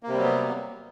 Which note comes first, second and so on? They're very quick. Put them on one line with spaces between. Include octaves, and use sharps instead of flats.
A#3 C3 G3 F#3 B3